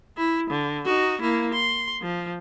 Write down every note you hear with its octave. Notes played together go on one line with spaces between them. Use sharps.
E4
D3
D#4 F#4
A#3 E4
C6
F3